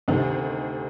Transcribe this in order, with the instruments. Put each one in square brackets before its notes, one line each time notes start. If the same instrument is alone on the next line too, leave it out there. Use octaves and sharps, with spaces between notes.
[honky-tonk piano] D2 C3 D#3